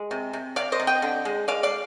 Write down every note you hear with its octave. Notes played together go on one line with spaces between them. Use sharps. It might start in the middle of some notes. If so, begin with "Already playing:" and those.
Already playing: G#3
C3
C3
C3 D5 F5
C5 D#5
C3
D#5 G5
D3
G#3
G#3 D5 F5
D5 F5